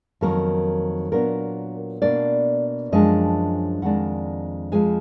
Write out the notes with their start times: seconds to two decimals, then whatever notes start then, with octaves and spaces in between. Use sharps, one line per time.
0.21 F2 D#3 F#3 A#3 A#4
1.12 A#2 F#3 B3 D4 A#4
2.02 B2 A#3 D4 D5
2.92 F#2 F3 G#3 D4 D#5
3.82 F2 D#3 G#3 D4 F#5
4.72 F2 F3 G#3 G#5